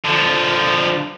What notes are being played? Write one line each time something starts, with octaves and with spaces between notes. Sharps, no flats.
D3 F3